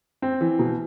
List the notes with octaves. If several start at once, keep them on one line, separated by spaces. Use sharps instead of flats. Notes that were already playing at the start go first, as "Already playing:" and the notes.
C4
E3
B2